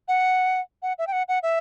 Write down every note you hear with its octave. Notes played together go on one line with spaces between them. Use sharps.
F#5
F#5
E5
G5
F#5
F#5
E5